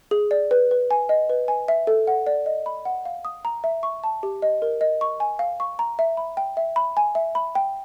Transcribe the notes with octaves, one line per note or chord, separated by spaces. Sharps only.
G#4
D5
B4
B4
G#5
D#5
B4
G#5
E5
A4
F#5
D5
D#5
B5
F#5
F5
D#6
A#5
E5
C#6
A5
G4
D#5
A#4
D#5
C#6
G#5
F5
C#6
A#5
E5
B5
G5
E5
B5
G#5
E5
B5
G5